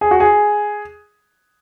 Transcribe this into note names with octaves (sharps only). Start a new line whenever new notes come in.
G#4
F#4
G#4